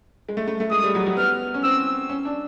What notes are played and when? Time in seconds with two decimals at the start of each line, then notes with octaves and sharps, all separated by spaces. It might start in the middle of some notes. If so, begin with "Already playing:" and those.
0.29 G#3
0.37 A3
0.48 A3
0.60 A3
0.71 G#3 D#6
0.83 G3
0.95 F#3
1.07 F#3
1.17 B3 F6
1.54 C#4
1.64 C4 E6
2.09 C#4
2.25 D4